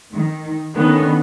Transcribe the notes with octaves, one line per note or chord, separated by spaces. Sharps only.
D#3
D3 D#3 B3 C#4